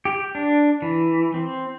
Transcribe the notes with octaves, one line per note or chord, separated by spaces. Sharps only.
G4
D4
E3
C4